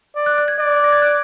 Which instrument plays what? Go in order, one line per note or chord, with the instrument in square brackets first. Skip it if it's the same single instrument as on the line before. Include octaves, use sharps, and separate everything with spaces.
[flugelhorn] D5
[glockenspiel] F#6
F#6
G#6
[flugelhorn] D5
[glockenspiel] A#6
G#6
F#6